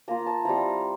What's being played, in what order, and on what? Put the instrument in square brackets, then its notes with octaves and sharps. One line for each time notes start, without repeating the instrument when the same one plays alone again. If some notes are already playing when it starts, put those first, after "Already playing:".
[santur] A#3 F4 A#5
A5
G3 C4 E4 A#5